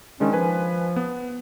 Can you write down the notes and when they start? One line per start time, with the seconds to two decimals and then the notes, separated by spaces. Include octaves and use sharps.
0.20 D#3 G#3 C#4 D4
0.33 F3 B4 G#5
0.96 B3